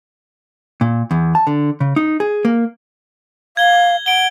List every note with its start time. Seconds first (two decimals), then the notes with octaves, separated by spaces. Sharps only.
0.81 A#2
1.11 E2
1.35 A5
1.47 D3
1.80 C#3
1.96 D#4
2.20 G#4
2.45 A#3
3.57 F5 G#6 G7
4.06 F#5 D7 G7